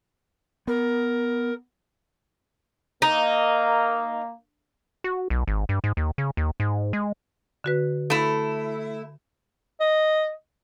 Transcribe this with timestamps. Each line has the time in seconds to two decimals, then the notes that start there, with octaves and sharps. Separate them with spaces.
0.67 B3 A#4
3.02 A#3 D#4
5.04 F#4
5.30 B1
5.47 G#1
5.69 G2
5.84 G#2
5.97 D#2
6.18 C#3
6.37 D#2
6.60 G#2
6.93 G#3
7.64 D3 F#4 B4
8.10 A3 E4
9.80 D#5